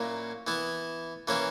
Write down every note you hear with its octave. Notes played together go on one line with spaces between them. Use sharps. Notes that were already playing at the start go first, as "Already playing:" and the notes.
Already playing: A#2 F#3 A#3 C#4 E4
E3 B3 E4
E3 A#3 C#4 E4